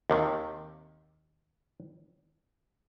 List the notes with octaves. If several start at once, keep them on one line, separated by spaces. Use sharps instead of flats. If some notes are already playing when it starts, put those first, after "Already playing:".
D#2 C3 D#3